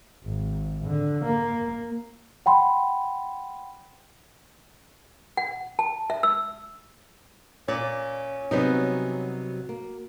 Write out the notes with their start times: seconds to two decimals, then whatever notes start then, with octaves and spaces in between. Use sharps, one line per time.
0.24 G#1
0.86 D3
1.25 A#3
2.46 F#5 G5 B5 C6
5.37 F#5
5.79 A5
6.10 E5
6.23 E6
7.68 A#2 C#4 D5
8.51 C3 F#3 G3 B3 D#4 F#4
9.69 A#3